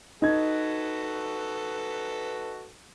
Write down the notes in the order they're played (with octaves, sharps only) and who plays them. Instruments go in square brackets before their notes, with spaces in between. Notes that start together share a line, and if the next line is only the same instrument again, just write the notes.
[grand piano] D#4 G#6 [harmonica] F#4 A4 B4